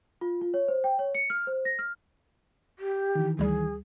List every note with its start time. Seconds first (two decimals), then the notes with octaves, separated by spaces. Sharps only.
0.21 F4
0.41 F4
0.54 C#5
0.68 C5
0.84 G5
0.99 C#5
1.15 C#7
1.30 F6
1.47 C5
1.65 A#6
1.79 F6
2.79 G4
3.15 D#3 E3
3.39 D2 G3 G#4